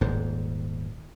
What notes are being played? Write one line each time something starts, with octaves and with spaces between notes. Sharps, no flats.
D#1 G#2